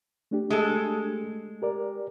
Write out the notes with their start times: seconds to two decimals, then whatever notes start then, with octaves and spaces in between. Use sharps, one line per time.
0.31 A3 D4 G4
0.50 G#3 A4
1.62 G4 A#4 D5